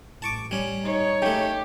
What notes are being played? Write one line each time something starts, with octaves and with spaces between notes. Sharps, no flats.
A1 A5 C#6 D6
G3 C#4
D#4 C#5
C#3 A3 G4